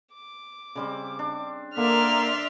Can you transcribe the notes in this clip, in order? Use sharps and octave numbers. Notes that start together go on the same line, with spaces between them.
D6
C#3 G3 C4
D4
D3 A#3 D5 E5 C6 F6